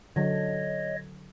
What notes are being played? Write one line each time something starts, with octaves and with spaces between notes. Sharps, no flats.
D3 F#3 C#5 D#5